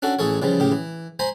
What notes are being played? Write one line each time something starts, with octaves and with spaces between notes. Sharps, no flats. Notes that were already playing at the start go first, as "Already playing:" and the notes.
C#4 D4 F#4 A4
A1 E3 G#4 A4 C#5
C#3 E3 F3 G3
A2 C#3 G4
E3
C5 G#5 A#5 B5